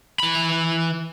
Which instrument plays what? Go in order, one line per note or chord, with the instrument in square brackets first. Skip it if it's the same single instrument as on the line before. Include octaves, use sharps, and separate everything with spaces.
[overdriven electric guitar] E3 B5